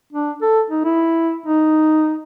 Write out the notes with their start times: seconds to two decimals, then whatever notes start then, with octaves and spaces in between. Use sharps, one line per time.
0.13 D4
0.42 A4
0.70 D#4
0.84 E4
1.46 D#4